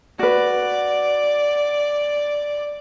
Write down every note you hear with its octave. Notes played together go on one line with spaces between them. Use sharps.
F#4 B4 D5